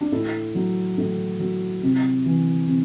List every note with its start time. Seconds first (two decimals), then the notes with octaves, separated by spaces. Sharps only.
0.01 D4
0.12 A2 E4
0.55 F#3
0.98 A2
1.40 F#3
1.83 C3
2.26 E3
2.68 C3